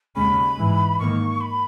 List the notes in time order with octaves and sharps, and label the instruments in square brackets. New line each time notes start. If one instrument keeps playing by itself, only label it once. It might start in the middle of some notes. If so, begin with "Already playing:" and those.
[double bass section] D#2 C#3 G#3 C#4 [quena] B5
[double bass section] G#2 E3 G#3
[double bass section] G#2 D#3 A#3 [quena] C#6
[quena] B5